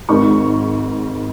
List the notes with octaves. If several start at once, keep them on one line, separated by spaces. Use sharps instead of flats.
G#1 G#2 D#3 C#6